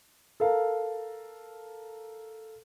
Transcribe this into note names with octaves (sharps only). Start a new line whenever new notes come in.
A4 A#4 F5